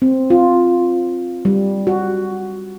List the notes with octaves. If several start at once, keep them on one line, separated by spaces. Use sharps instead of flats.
C4
F4
G3
F#4